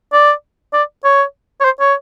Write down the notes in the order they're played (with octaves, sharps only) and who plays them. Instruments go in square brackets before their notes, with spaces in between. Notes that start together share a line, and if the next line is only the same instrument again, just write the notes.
[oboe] D5
D5
C#5
C#5
C5
C#5